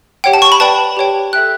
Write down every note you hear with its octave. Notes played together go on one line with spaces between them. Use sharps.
G4 C#5 F#5 G5
A5
C#6
B5
B4 D5 G5 A5
G4 C#5 G5
A4 E5 G5 F#6